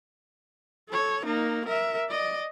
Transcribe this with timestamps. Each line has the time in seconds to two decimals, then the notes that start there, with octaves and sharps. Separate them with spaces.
0.89 A4 C#5
1.25 A#3 D#4
1.65 A#4 E5
2.10 D5 D#5